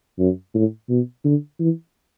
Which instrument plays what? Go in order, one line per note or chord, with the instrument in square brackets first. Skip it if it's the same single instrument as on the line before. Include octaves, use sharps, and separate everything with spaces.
[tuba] F#2
A2
B2
D3
E3